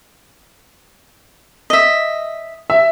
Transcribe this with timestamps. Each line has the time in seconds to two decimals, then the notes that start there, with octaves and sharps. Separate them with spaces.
1.70 D#5 E5
2.70 E5